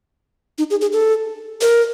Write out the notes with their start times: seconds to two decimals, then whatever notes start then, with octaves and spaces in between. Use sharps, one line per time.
0.58 D#4
0.71 G#4
0.81 G#4
0.93 A4
1.61 A#4